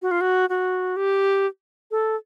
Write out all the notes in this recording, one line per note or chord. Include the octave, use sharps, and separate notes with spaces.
F#4
F4
F#4
F#4
G4
A4